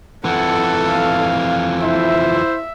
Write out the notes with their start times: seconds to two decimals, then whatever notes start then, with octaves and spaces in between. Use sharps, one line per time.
0.25 F2 E3 A4 F#5
0.88 F5
1.82 E4 C5 E5